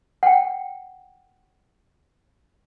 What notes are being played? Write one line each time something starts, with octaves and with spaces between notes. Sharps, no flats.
F#5 G5